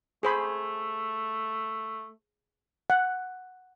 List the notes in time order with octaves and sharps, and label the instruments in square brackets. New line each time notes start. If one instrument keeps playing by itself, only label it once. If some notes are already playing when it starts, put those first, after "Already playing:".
[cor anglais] A3 [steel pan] G#4 C5 B5
[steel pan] F#5